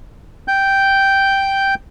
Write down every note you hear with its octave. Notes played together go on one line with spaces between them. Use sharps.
G5 G6